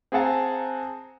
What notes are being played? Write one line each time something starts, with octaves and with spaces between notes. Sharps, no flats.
C4 G#4 F5 F#5 A5 A#5